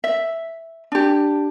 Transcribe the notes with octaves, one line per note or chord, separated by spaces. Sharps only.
E5
D4 G4